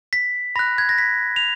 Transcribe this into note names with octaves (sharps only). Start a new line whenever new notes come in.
B6
B5 F#6 A#6
G#6
A#6
B6
F7